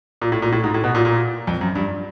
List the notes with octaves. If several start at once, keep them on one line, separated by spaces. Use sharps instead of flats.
A#2
A2
A#2
A2
G#2
A2
B2
A#2
A#2
F2
F#2
G2